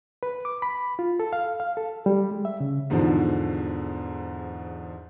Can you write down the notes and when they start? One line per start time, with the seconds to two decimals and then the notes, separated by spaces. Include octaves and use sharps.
0.23 B4
0.45 D6
0.62 B5
0.99 F4
1.20 A4
1.33 F5
1.60 F5
1.77 A4
2.06 G3
2.31 G#3
2.45 E5
2.60 C#3
2.90 E2 G#2 B2 D3 F3